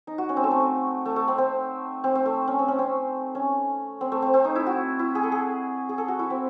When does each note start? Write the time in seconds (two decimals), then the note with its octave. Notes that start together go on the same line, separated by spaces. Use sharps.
0.07 D#4
0.18 F#4
0.29 C#4
0.37 C4
0.44 A3
0.51 C4
1.05 A3
1.16 A3
1.28 C4
1.38 C4
2.04 C4
2.15 C4
2.26 A3
2.48 C#4
2.59 C4
2.68 C#4
2.79 C4
3.35 C#4
4.01 C4
4.12 A3
4.22 C4
4.34 C4
4.44 D#4
4.55 E4
4.66 F#4
4.99 E4
5.15 G#4
5.23 A4
5.32 G#4
5.89 G#4
5.98 A4
6.08 F#4
6.19 E4
6.30 C4